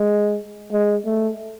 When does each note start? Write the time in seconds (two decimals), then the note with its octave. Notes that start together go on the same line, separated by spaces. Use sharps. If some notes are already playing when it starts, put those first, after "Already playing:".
Already playing: G#3
0.72 G#3
1.06 A3